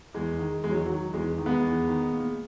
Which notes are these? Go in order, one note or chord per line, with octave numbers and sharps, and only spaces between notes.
E2 G#3
D#3
E2 G#3
F#3
D#3 F#3
E2 G#3
D#3
G#3 B3
E2
D#3
A#2